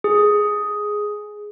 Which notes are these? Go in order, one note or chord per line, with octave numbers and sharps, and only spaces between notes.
G#4